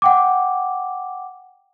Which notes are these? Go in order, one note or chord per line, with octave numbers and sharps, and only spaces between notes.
F#5 G5 D6